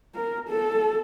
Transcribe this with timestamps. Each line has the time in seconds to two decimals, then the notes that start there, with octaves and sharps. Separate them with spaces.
0.15 A#4
0.48 A4